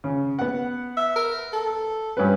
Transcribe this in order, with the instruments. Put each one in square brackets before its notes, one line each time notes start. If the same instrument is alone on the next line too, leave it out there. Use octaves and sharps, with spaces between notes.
[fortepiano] C#3
B3 F#5
[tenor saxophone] E5
A#4
A4
[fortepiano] G2 C#4 B4